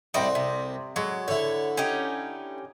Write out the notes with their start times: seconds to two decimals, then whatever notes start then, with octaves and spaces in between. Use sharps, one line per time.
0.14 C2 G3 A3 C4 D5 D#5
0.35 C3
0.96 F#3 G#3
1.28 D3 E4 C#5
1.77 C#4 D#4 G4